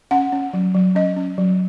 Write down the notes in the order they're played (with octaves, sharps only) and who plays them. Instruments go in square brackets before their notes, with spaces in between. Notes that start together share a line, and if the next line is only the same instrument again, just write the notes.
[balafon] C#4 F#5
C#4
F#3
F#3
C#4 D#5
C#4
F#3